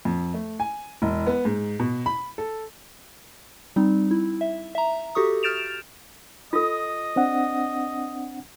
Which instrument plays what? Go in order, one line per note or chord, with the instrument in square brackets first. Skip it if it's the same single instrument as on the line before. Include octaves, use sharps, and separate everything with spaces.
[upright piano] F2
A3
G#5
E1
B3
G#2
B2
B5
A4
[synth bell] G3 C4 D#4
E4
E5
E5 A#5
F#4 G4 A4 C#6 D#6
F6 G6 A6 D7 E7 F7
[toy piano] F4 A4 [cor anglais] D#5
[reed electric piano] C4 D4 F#5